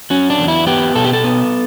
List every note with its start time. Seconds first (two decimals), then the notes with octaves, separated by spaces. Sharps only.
0.10 F#3 C#4
0.30 D4
0.38 E2
0.48 E4
0.67 B3 G4
0.95 B2 A4
1.04 G4
1.13 A4
1.24 B3